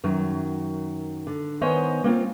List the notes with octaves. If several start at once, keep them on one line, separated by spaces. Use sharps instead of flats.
F#2 D#3 F#3
D3
D#3 B3 C5 C#5 D#5 G#5
A#3 C4 D4 F4